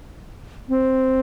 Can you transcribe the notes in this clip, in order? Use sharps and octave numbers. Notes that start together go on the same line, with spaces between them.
C4